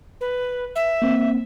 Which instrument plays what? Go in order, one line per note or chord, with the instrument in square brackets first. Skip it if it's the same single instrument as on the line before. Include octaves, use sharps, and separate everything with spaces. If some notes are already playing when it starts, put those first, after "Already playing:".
[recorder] B4
E5
[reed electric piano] A#3 C4